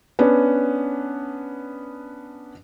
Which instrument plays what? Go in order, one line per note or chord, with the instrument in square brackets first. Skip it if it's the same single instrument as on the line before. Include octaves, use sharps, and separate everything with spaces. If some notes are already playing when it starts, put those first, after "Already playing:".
[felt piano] B3 C#4 D4